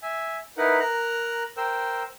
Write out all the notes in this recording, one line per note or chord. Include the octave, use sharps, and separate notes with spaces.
E5 G#5
D#4 E4 A#4 B4 F#5
A#4 A#5 F#6
A#4 C5 G5 E6